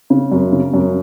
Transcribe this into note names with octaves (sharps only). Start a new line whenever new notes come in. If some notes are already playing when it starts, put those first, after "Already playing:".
C#3
F#2
C#3
F#2